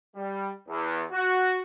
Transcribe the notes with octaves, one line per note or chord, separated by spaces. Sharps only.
G3
E2
F#4